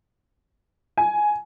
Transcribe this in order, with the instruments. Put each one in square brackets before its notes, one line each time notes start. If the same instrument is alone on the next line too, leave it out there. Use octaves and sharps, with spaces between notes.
[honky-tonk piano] G#5